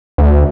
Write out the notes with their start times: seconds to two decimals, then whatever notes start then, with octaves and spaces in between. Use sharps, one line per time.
0.18 D2